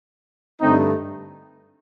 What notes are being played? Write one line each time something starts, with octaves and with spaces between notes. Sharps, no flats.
G2 D3 A3 C4 D#4